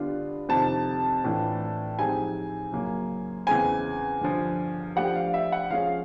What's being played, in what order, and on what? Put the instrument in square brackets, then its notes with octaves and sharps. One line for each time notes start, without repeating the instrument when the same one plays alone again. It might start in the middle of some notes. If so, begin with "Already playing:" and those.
Already playing: [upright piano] D3 G3 B3 D4 F4
[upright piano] F2 C3 D#3 [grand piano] A5
[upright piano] A2 E3 A3 D4 F4
[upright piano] F3 G#3 C4 D#4 G4 [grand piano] G#5
[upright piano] F#2 C#3 F#3 A#3
[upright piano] E2 C#3 E3 G#3 C4 [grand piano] G#5
[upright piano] G2 D3 F3
[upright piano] F3 A3 D4 G4 [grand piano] F#5
[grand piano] F5
E5
F#5
[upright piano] F3 G#3 C#4 F4 G#4 [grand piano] F5